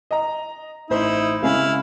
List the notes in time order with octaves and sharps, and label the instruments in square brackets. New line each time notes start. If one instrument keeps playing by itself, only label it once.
[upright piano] D#5 A#5
[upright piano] A1 C5 [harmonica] D#4 E4
[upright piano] C#3 G#3 C#4 [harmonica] E4 F5